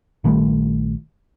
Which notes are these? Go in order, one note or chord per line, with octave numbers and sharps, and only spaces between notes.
A#1 D#3 G3 A3